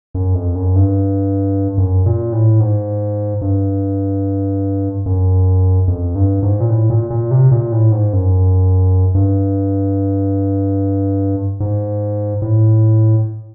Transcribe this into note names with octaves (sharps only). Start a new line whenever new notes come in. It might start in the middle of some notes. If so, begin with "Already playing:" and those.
F#2
F2
F#2
G2
F#2
A#2
A2
G#2
G2
F#2
F2
G2
G#2
A#2
A2
A#2
A#2
C3
A#2
A2
G#2
F#2
G2
G#2
A2